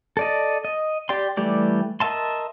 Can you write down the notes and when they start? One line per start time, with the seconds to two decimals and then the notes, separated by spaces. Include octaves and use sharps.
0.17 A4 D5 D#5
0.65 D#5
1.09 G4 D5 G5 C6
1.37 E3 G3 A3 G4 D5
2.00 A#4 D#5 E5 A5 C6